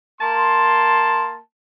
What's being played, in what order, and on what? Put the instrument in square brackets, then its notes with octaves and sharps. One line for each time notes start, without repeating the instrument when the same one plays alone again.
[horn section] A#3 A5 C6